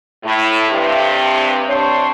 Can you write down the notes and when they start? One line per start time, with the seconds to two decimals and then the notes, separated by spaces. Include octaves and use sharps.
0.24 A2 E4
0.69 G2 C3
1.68 C3 D4 C5 C#5